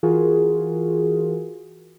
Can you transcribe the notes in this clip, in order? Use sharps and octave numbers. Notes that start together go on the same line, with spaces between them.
E3 F4 F#4 G#4 A#4